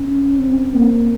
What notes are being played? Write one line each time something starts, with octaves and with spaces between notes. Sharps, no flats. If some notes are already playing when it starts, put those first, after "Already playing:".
Already playing: C#4
C4
A#3